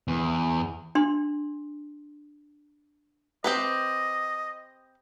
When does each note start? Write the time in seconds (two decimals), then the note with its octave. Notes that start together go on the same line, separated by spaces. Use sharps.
0.08 E2
0.95 D4 C6
3.44 C4 G4 B4 D#5